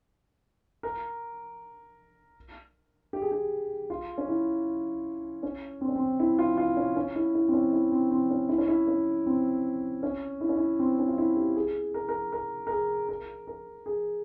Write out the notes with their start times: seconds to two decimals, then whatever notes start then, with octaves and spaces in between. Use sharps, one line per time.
0.83 A#4
3.13 G4
3.22 G#4
3.31 G4
3.90 F4
4.18 C#4
4.28 E4
5.43 C#4
5.81 C4
5.88 C#4
5.96 C4
6.19 E4
6.39 F4
6.57 F4
6.77 C#4
6.96 C#4
7.15 E4
7.35 E4
7.48 C4
7.54 C#4
7.73 E4
7.92 C4
8.11 C4
8.30 C#4
8.49 E4
8.58 C#4
8.68 E4
8.87 C#4
9.26 C4
10.03 C#4
10.41 E4
10.49 C#4
10.57 E4
10.79 C4
10.99 C#4
11.08 F4
11.18 E4
11.36 G4
11.56 G#4
11.94 A#4
12.09 A#4
12.32 A#4
12.67 A#4
12.71 G#4
13.09 A#4
13.47 A#4
13.86 G#4